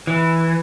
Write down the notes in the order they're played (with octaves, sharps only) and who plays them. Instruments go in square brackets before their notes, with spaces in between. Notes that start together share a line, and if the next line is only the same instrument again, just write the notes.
[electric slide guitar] E3